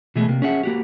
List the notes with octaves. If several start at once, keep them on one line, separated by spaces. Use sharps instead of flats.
B2 E3 G#3 A3 G#4
C3 A#3
C#4 G#4 E5 F#5
A#3 F#4 G4